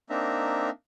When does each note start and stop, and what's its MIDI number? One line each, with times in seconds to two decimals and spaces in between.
0.10 0.70 58
0.10 0.70 60
0.10 0.70 62
0.10 0.70 63
0.10 0.70 76
0.10 0.70 82